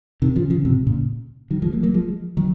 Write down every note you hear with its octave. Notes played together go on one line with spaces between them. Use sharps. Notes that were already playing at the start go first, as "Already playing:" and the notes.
C3 D#3
C#3 F3
C#3 F3
G#2 C3
A#2 C#3
D#3 F#3
F3 G#3
F#3 A#3
F#3 A#3
F3 G#3
D#3 F#3